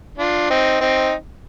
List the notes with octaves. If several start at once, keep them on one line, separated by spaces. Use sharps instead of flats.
D4 F4
C4 D#4
C4 D#4